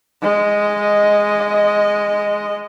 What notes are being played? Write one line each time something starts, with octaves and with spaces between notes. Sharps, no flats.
G#3 D#5